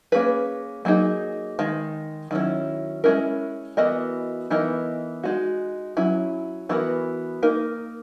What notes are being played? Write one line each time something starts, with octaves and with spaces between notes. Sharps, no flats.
A#3 C#4 G#4 B4
F#3 A#3 D#4 G#4
D#3 G#3
D#3 F#3 C#4 E4
G#3 C#4 E4 A#4
E3 B3 F#4 A#4 D#5
E3 B3 D#4 A#4 D#5
G#3 D#4 F#4
F#3 C#4 E4
E3 B3 F#4 A#4
A#3 D#4 A#4